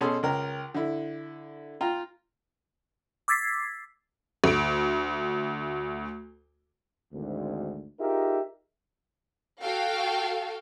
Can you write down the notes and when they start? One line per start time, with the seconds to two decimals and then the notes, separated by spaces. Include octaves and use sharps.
0.01 B2 C#4 G#4 A4 C6
0.23 C#2 A#4 G5
0.74 D3 E4
1.81 F4 G5 A#5
3.28 D6 E6 G#6 A6 B6 C7
4.44 D2 D7
7.13 G#1 D2
8.00 D#4 F4 G4 G#4 A#4 E5
9.61 F#4 A4 F5 G5